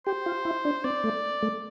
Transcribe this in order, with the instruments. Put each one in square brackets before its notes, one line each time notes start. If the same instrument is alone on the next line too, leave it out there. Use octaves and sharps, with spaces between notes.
[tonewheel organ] G4 [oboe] C5
[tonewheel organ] F4
E4
D4
[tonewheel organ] C4 [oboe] D5
[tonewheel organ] A3
A3